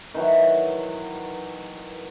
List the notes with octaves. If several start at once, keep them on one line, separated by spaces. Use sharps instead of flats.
D#3 E3 F#3